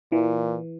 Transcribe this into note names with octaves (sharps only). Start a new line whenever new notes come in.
A#2 E3